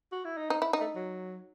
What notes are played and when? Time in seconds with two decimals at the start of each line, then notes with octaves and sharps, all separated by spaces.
0.12 F#4
0.25 E4
0.37 D#4
0.50 C4 D#4
0.62 E4
0.73 D#4
0.80 A3
0.96 F#3